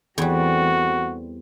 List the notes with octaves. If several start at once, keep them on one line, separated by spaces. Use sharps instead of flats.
E2 E3 G3 A3 C4 F#4